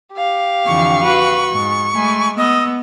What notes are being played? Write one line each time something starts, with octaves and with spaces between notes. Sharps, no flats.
G4 F5
F2 D3 E3 C#6
F#4 B4
G#2
G#3 A3 G#5 B5
B3 D#5 E6